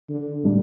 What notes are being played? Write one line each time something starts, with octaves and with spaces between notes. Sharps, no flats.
D3
A2 G3 D4